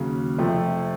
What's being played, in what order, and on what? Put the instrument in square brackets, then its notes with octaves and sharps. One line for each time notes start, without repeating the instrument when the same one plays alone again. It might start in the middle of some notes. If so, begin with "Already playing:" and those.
Already playing: [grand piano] D#2 C#3 F#3
F2 C3 F3 A3